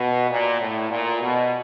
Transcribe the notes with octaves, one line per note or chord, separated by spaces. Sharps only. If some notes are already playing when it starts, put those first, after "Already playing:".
Already playing: B2
A#2
A2
A#2
B2